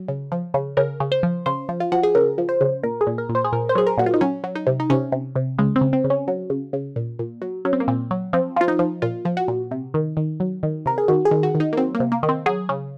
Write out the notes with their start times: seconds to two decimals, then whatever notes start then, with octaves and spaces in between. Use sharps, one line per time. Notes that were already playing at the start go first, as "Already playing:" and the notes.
Already playing: F#3
0.08 C#3
0.32 F3
0.54 C#3
0.77 C#3 A#4
1.00 C#3
1.12 C5
1.23 F3
1.46 C#3 C5
1.69 F3
1.80 F4
1.92 F3 F#4
2.03 G#4
2.15 C#3 A#4
2.38 F3
2.49 C5
2.61 C#3
2.83 A#2 A#4
3.01 G#4
3.07 A#2
3.18 A#4
3.29 A#2
3.35 C5
3.44 G#4
3.52 A#2 A#4
3.69 C5
3.75 F#3 G#4
3.87 A#4
3.98 A#2 F#4
4.06 F4
4.14 D#4
4.21 F#3 C#4
4.44 F#3
4.55 D#4
4.67 C3
4.80 D#4
4.90 C3 C#4
5.12 C3
5.36 C3
5.58 C#3 G#3
5.76 C4
5.81 C#3
5.93 C4
6.04 C#3
6.10 C#4
6.28 F#3
6.50 C#3
6.73 C#3
6.96 A#2
7.19 A#2
7.42 F#3
7.65 F#3 C#4
7.73 C4
7.80 A#3
7.88 A#2 C4
8.11 F#3
8.33 F3 C4
8.56 F3 F4
8.68 D#4
8.79 F3
9.02 A#2 F4
9.25 F3
9.37 F#4
9.48 A#2
9.71 C3
9.94 D#3
10.17 D#3
10.40 F#3
10.63 D#3
10.86 C3 A#4
10.98 G#4
11.08 D#3 F#4
11.25 G#4
11.31 D#3
11.43 F#4
11.55 D#3
11.60 D#4
11.73 A#3
11.77 F#3 C4
11.95 A#3
12.00 C3
12.12 A#3
12.23 D#3
12.29 C4
12.46 F#3 G#4
12.69 C#3